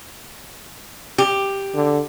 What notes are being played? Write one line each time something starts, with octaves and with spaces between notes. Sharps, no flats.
G4
D3